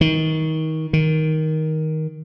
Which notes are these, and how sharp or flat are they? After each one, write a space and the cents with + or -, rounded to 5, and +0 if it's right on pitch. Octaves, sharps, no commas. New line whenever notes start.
D#3 +25
D#3 +10